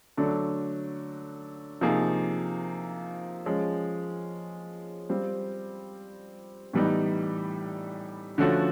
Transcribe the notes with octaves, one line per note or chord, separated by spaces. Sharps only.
D3 F#3 A3 D4
C3 F3 A#3 D#4 G#4
F3 G#3 C#4
G3 C4 F4
A2 E3 G3 B3 D#4
D3 F3 A3 C#4 F#4